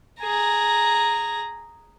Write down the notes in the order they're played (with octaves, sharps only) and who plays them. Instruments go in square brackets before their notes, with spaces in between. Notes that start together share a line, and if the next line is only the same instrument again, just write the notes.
[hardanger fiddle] G#4 A#5